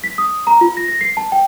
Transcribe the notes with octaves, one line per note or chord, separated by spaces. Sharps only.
B6
D#6
A#5
F4
A#6
A#6
C7
A5
G5